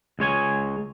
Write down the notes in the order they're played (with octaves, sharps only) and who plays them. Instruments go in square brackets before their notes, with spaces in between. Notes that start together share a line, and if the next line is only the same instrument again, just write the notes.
[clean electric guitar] C#2 G#3 C#5 G#5